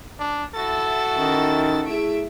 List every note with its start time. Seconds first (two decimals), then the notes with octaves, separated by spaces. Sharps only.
0.19 D4
0.55 E4 F#4 A4 A6
1.17 D#3 C#4 D#4
1.86 A3 E4 G#4 E5 D7